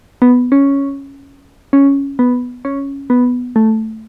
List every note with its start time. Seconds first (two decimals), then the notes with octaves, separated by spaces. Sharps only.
0.22 B3
0.52 C#4
1.73 C#4
2.19 B3
2.65 C#4
3.10 B3
3.56 A3